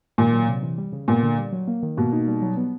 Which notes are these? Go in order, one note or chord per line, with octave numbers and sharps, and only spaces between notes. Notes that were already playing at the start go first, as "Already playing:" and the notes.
A#2 D#3
F#3
C3
E3
G3
C#3
A#2 B3
D3
G3
F#3
A#3
D#3
B2 A#3
D#4
G3
F#3
B3